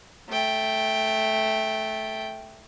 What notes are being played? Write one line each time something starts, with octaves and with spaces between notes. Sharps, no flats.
A3 G5